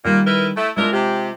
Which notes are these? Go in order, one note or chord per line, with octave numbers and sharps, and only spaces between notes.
A#2 D#3 G3 A#3
E4 A#4 B4
A3 E4
G#3 D4 E4 F4 A#4 A5
C3 G4